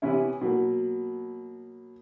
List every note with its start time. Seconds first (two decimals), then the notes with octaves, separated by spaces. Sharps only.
0.02 C3 E3 B3 C#4 E4
0.41 B2 F#3 A#3